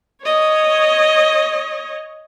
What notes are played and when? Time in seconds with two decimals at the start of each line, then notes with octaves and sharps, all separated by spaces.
0.24 C#5 D#5